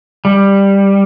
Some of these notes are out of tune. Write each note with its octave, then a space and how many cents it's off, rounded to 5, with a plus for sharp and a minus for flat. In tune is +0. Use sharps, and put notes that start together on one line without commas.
G3 +10